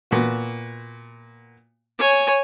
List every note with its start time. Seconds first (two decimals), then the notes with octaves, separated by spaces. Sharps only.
0.11 A#2 B3 F#4
1.99 C#5 G#5